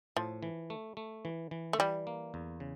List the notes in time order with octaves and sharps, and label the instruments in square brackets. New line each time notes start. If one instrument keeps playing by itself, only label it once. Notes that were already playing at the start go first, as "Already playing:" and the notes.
[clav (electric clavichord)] A2 [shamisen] F3
[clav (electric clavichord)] E3
A3
A3
E3
E3
[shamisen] A3
[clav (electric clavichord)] E3 [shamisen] G3
[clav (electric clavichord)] A#3
E2
C#3